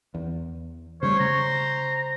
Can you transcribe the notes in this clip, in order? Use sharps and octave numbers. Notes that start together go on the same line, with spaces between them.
E2
C#3 G3 A3 C5 C#5
C#3 A#5